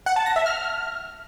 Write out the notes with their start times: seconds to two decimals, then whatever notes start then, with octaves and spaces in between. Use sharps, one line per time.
0.06 F#5
0.16 A5
0.26 A#6
0.36 E5
0.46 F6